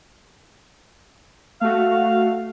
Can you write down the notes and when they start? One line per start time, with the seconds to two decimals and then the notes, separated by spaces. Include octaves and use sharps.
1.61 A3 F#4 F5